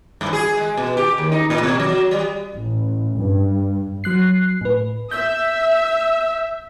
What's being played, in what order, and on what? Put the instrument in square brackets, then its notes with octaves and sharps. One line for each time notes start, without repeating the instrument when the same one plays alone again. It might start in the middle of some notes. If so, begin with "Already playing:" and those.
[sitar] G2
G#4
G#3
B2
G4
D#2
D#4
A2
B2
F#3
G3
[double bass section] A1
G2
[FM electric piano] F#3 F#6 C7
A2 B4
[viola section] E5 [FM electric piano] G6